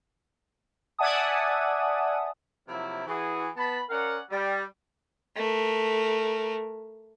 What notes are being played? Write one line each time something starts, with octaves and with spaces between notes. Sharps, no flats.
D5 E5 F#5 G#5 A5 D#6
C3 F3 F#3 A#3 E4
E3 F#4 G#4
B3 A5 B5
C#4 A#4 D5 F5 F#5
G3
A3 A#4